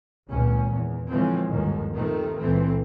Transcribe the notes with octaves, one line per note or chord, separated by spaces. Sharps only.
G#1 C#2 A#2 C#4
E2
D3 E3 F3 G#3 C4 C#4
G1 D#2 G#2 D#3 F3
C3 D#3 F3 A3 C4
C#2 A#2 E3 A3 C4